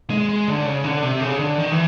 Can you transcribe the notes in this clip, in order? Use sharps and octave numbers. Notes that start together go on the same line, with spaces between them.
G#3
G#3
D3
C#3
D3
C3
C#3
D3
D#3
E3